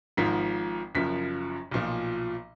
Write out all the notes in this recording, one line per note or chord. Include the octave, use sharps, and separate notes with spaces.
G#1 G#2 F3 B6
F#1 F#2 F3 B6
B1 A#2 F3